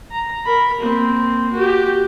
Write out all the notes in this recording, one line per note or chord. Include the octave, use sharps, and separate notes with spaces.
A#5
A#4 B5
A#3 C4
F#4 G4